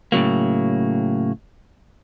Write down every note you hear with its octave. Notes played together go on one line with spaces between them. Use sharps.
A2 C#3 F#3 A#3